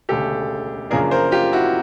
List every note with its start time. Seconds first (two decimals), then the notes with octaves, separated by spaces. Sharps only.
0.09 E1 D2 C#3 G4 A4
0.90 F#2 C#3 F3 A#3 D4 G#4 A#4
1.11 A#4 C5
1.31 F4 G4
1.52 E4 F#4